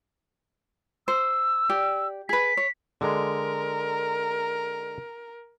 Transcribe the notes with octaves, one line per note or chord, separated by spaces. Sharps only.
C5 E6
G4 D5
G#4 B4 B6
C#5
D3 G#3 A#4